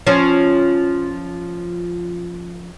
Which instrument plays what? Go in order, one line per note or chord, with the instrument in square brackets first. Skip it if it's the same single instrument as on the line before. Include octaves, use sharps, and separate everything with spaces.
[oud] F3 C#4